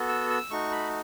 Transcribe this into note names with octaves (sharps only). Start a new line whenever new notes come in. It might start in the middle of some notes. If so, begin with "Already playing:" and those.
Already playing: B3 F#4 A4
E6
E6
A3 D#4 F#4 C#6
B5